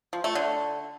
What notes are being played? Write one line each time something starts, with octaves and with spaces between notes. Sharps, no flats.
F3
A3
D3